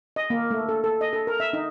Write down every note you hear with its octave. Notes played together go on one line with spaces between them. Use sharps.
D#5
A#3
A3
A4
A4
D#5
A4
A#4
E5
D#4